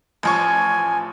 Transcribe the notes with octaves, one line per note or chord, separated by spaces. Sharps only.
A1 F3 G#5 C#6